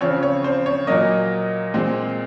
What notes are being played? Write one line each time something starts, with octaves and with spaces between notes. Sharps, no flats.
C#3 F3 C4 C#5
C#5
C5
C#5
A#2 F#3 A#3 D#5
A#2 G#3 C4